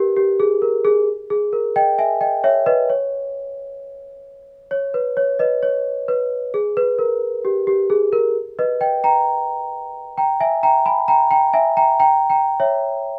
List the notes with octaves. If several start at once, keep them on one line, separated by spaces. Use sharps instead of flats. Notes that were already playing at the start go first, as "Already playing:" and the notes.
Already playing: G4 A#4 B4
G4
G#4
A#4
G#4
G#4
A#4
D#5 G5
E5 G#5
D#5 G5
C#5 E5
B4 D#5
C#5
C#5
B4
C#5
B4 D#5
C#5
B4
G#4
B4
A#4
G4
G4
G#4
A#4
B4 D#5
D#5 G5
G5 A#5
G5 A#5
E5 G#5
G5 A#5
G#5 B5
G5 A#5
G5 A#5
E5 G#5
G5 A#5
G5 A#5
G5 A#5
C#5 E5